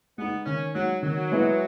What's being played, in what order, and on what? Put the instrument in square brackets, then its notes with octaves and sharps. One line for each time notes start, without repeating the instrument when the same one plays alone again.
[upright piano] G#3 D#4 [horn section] B3
[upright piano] D#3 [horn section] C#4
[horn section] F#3 [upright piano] G#3 D#4
[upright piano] D#3 [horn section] F#3
[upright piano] G#3 B3 E4